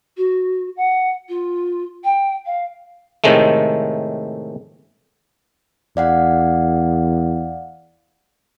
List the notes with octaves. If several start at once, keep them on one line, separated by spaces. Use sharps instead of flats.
F#4
F#5
F4
G5
F5
A2 C3 D#3 G#3 A3
E2 D5 F5 F#5